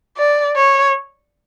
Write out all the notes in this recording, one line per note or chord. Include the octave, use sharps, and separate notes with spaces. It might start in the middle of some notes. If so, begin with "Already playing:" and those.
D5
C#5